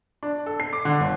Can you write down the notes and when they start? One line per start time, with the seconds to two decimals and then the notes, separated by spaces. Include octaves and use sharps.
0.23 D4
0.46 A4
0.60 C7
0.73 D6
0.85 D3
1.00 G1